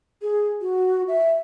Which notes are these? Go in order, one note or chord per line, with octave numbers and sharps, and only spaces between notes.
G#4
F#4
E5